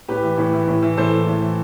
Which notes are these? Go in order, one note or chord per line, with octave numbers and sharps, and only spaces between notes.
A2 G4 B4
E3
A2
E3
A2
E3
A2 A4 C5
E3
A2
E3